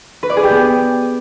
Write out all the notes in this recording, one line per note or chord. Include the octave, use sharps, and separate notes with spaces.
B4
D5
G#4
G4
B3